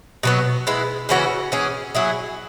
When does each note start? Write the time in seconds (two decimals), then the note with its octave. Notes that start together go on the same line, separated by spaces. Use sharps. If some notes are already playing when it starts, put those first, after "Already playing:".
0.23 B2 F#3 B3
0.67 G#3 B3 E4
1.09 C#3 E3 C#4 F#4
1.52 E3 C#4 G#4
1.95 F#3 E4 G#4